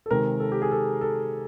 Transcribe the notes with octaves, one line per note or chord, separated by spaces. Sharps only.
A4
C3 D#3 G#3 A#4
A4
G4
G#4
A4
A4